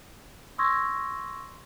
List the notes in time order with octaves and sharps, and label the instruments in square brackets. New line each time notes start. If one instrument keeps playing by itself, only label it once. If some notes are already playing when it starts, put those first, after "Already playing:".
[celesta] C6 C#6 D#6 E6 G#6 A#6